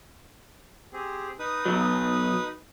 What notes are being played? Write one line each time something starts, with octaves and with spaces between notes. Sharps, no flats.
C4 G4 G#4
D#4 B4 D#6
B1 F#3